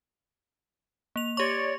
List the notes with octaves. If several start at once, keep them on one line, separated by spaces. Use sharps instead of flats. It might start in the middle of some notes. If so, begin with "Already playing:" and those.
A#3 F7
G4 C#5 D5 C#6